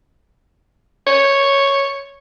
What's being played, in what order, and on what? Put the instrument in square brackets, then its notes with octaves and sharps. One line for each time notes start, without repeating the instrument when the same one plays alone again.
[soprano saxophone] C#5